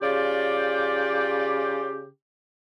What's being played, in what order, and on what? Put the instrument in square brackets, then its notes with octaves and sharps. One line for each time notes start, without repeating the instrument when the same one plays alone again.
[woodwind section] C#3 G4 [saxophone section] F4 D5